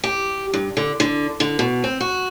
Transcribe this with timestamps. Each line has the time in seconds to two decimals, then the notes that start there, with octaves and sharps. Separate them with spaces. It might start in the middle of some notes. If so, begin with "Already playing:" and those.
0.04 G4
0.54 G2
0.77 D3
1.00 D3
1.40 D3
1.59 B2
1.84 C4
2.00 F#4